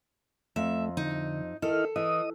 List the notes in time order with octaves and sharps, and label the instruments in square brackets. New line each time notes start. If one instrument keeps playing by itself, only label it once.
[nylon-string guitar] F2 [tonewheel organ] A3 [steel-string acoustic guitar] E5
[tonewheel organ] D3 [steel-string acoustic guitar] D#4
[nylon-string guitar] D#3 [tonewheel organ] E4 D#5 F6 [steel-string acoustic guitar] A4
[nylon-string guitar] E3 [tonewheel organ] D#5 D#6